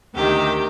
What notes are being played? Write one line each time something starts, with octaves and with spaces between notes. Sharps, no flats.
D2 C3 D#3 G4